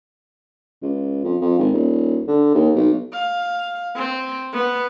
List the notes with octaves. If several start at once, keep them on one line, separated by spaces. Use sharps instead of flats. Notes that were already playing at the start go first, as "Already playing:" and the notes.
C#2
F2
F2
G#1
D#1
D3
D#2
B1
F5
C4
B3